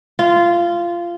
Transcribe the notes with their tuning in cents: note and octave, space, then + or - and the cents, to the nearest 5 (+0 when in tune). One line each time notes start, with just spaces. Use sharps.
F4 -15